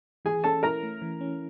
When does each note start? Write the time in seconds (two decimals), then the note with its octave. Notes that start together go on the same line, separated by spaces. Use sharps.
0.25 E3 G#4 G#5
0.44 C#4 A4 A5
0.63 E4 A#4 A#5
0.83 A3
1.02 E3
1.21 C#4